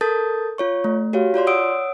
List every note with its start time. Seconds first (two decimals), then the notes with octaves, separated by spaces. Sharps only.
0.01 A4 A#4 A5 D#6 G6 A6
0.58 F4 C#5 C#6
0.84 A3
1.13 F#4 G4 C#5 F5
1.34 F4 C#5 D5 C6
1.47 C#5 F#5 D#6 E6 D7